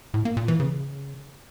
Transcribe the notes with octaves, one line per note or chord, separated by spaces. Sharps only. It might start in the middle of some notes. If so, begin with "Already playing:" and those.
A2
A#3
A#2
E3
C#3